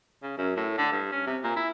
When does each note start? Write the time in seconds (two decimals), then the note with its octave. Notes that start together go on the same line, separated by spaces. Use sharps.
0.23 C#3
0.38 F#2
0.56 A2
0.78 D3
0.92 G2
1.12 C#4
1.27 C3
1.43 A#2
1.56 E4